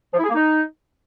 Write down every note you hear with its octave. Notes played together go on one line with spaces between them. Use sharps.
F3
E4
G#4
A#3
D#4